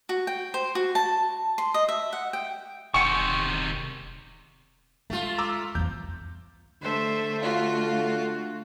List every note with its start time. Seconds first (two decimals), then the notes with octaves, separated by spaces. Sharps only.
0.09 F#4
0.27 G5
0.54 C5
0.75 F#4
0.95 A5
1.58 C6
1.74 D#5
1.89 E5
2.13 F#5
2.33 G5
2.94 E1 C3 D#3 G5 G#5 C#6
5.10 G#3 A3 F4
5.38 A#5 D6 E6
5.75 E2 C4 G6
6.82 D3 A3 C5 E5
7.42 F4 F#4